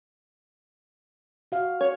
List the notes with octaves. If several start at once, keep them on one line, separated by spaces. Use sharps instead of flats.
F#4 F5
C#5